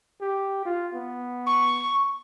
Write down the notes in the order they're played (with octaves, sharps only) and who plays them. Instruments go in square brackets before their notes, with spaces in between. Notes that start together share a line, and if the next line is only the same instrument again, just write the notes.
[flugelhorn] G4
F4
B3
[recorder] C#6